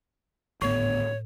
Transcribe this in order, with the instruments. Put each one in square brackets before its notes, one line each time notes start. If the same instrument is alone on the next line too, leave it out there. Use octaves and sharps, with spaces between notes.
[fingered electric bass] G#1 D2 B3 [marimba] A2 [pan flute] C#5